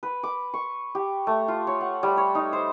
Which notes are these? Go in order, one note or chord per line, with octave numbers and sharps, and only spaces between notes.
B4
D6
C#6
G4
A3
F4
C#5
F#5
G3
C#5
D#4
C5